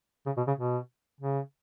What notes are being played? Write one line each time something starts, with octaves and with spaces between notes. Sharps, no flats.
C#3
B2
C#3
B2
C#3